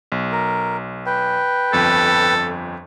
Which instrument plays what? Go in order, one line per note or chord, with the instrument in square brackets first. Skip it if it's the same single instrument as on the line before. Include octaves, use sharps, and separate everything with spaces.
[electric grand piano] B1
[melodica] A#4
B4 G5
[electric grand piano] G1 F2 [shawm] A4